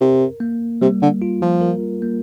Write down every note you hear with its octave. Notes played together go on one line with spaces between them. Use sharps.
C3 A#4
A#3
C3 G3
D3
F4
F3
A#4
A#3